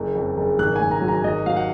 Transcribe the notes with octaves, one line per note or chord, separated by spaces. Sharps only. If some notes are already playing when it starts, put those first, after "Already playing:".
Already playing: F#1
F2
F#1
G#1 F#6
G#5
G#1
A#5
F#3
A#5
G#1 D#5
F#3 F5
F#5